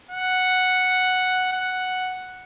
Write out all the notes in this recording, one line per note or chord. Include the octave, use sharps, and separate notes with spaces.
F#5
F#5